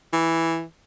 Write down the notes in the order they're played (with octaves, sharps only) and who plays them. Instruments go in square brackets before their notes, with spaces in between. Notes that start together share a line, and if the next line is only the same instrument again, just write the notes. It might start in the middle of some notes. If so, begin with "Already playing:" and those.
[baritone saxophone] E3